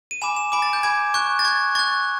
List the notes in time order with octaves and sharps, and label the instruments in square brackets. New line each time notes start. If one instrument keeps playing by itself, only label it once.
[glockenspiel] D#7
G#5 B5 D6 E7
E7
G#5 B5 D6 D7
A6
G6
G#5 B5 D6 G#6
C#6 F#6 G6
A6
C#6 F#6 G#6
C#6 F#6 A6